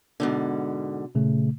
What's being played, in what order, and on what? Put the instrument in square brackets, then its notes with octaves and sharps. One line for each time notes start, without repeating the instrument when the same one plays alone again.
[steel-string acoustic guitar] G#2 B2 D3
[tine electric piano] A#2 C#3 A3